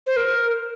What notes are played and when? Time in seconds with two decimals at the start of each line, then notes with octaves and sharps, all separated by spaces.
0.07 C5
0.17 A#4